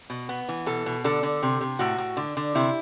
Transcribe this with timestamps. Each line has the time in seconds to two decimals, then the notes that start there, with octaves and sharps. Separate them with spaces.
0.10 B2
0.29 B3
0.49 E3
0.66 B2 A4
0.86 B2
1.04 D3 A4
1.23 D3
1.43 C3
1.61 C3
1.79 A2 F#4
1.98 A2
2.17 D3
2.37 D3
2.55 C3 E4